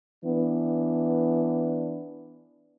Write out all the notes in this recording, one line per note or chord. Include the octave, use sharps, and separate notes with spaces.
E3 B3 D4